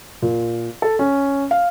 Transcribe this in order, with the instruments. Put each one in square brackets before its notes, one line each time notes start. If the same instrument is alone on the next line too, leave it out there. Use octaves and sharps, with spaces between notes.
[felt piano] A#2
A4
C#4
F5